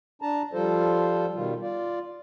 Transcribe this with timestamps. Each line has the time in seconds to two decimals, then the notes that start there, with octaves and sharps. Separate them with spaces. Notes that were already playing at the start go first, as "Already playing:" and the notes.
0.22 D4 A5 A#5
0.53 F3 G3 F4 A4 C5
1.35 B2 D#3 G3 F4
1.62 F4 D5